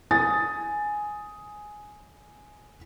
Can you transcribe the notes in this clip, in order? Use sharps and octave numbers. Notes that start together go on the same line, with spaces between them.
G#5 D#6 A6